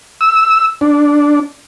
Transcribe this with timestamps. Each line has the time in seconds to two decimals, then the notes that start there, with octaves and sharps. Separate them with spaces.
0.21 E6
0.81 D4